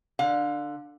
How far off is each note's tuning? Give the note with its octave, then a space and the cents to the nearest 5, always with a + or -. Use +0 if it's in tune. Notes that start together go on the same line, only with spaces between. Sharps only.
D3 +15 F5 +35